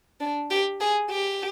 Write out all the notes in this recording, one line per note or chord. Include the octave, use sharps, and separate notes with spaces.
D4
G4
G#4
G4